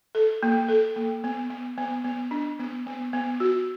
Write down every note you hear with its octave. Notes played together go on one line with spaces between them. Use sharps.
A4
A#3
A4
A#3
B3
B3
B3
B3
D4
B3
B3
B3
F#4